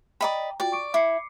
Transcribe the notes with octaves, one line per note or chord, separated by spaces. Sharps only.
D5 D#5 G5 A#5 B5
F4 F#4 D5 G5
C#6 D6 D7
E4 D6 C7 C#7